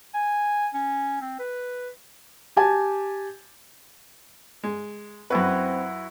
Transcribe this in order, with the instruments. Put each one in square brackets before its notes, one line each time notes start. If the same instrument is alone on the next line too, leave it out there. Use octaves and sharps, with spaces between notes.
[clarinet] G#5
C#4
C4
B4
[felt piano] G4 G#5 A5
[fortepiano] G#3
[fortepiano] F#2 B4 [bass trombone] C4 [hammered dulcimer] E4 F#4